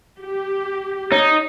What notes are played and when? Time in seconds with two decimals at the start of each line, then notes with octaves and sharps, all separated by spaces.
0.19 G4
1.12 D#4 C#5